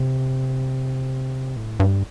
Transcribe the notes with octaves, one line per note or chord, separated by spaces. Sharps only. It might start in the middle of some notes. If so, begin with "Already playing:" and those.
Already playing: C3
A2
G2